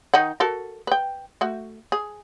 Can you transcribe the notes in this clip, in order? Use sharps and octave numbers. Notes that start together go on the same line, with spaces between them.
D#3 D#4 F#5
F#4 A4 A#4
B4 G5
A3 F#4
G#4